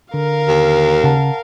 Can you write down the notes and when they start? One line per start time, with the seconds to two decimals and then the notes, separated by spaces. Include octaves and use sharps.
0.14 D3 A#4 F5
0.48 D#2
1.04 C#3 F#5 A5